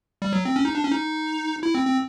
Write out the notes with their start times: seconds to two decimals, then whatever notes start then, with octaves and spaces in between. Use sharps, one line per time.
0.22 G3
0.33 F#3
0.45 C4
0.56 C#4
0.65 D#4
0.75 D4
0.84 C#4
0.92 D#4
1.63 E4
1.75 C4
1.87 C4